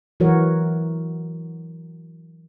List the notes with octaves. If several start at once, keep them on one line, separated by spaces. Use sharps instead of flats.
E3 F#3 F#4 A#4 C#5